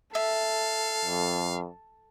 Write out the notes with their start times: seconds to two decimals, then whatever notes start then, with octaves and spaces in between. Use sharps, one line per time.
0.15 A4 E5 F5
1.05 F2